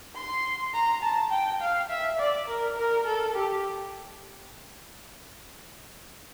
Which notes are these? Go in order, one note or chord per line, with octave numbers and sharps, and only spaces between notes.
C6
A#5
A5
G5
F5
E5
D5
A#4
A#4
A4
G4